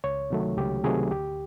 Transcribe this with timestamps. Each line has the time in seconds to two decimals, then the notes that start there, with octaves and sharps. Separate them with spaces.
0.04 C#2 C#5
0.30 C3 D#3 F#3 A3
0.57 C#2 G4
0.84 C3 D#3 F#3 A3 G#4
1.11 D2 G4